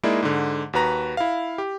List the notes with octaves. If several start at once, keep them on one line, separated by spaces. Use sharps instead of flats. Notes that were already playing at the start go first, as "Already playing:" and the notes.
G#3 A#3 D#4 E4 D5
G#2 D3
D#2 F#4 B4 A#5 A#6
E4 F5
G4